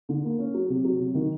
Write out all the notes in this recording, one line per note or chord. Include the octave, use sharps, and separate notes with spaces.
D3
A#3
C#4
F#3
C3
F#3
C3
D#3